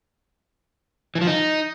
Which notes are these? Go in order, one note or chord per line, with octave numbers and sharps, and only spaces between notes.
E3
F3
D#4